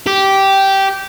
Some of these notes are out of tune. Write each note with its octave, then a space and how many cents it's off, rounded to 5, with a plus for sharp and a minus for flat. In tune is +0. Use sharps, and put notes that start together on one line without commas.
G4 -10